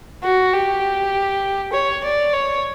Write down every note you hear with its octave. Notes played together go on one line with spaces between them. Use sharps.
F#4
G4
C#5
D5
C#5